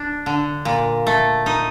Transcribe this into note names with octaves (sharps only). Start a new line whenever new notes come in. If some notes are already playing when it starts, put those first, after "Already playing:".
Already playing: D4
D3
A#2
A3
D#4